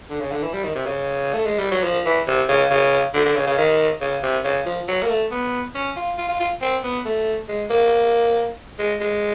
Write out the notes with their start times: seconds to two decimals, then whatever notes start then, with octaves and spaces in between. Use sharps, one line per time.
0.10 D3
0.21 C#3
0.31 D3
0.43 E3
0.53 G3
0.64 D#3
0.75 C3
0.86 C#3
1.34 A3
1.46 G#3
1.59 G3
1.71 F#3
1.84 F3
2.06 E3
2.27 C3
2.49 C#3
2.70 C#3
3.14 D3
3.25 D3
3.36 C#3
3.47 C#3
3.58 D#3
4.01 C#3
4.23 C3
4.44 C#3
4.65 F3
4.88 F#3
5.03 A#3
5.09 A3
5.31 B3
5.75 C#4
5.96 F4
6.18 F4
6.29 F4
6.40 F4
6.62 C4
6.84 B3
7.05 A3
7.49 G#3
7.70 A#3
8.79 G#3
9.00 G#3